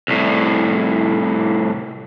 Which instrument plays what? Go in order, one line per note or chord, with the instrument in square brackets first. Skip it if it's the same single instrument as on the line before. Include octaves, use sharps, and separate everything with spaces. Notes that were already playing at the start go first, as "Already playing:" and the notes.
[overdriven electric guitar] C2 A2